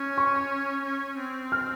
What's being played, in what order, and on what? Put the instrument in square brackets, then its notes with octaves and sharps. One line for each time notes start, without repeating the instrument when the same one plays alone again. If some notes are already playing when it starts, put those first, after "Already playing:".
Already playing: [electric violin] C#4
[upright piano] C#6
[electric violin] C#4
C4
[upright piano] F6